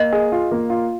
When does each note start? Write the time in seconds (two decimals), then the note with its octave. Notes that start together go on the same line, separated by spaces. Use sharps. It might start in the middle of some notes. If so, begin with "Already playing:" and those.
Already playing: A#3 D#5
0.13 G#4
0.32 F4
0.51 A#3
0.70 F4